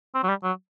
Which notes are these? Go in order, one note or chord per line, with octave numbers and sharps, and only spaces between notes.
C4
F#3
G3
F#3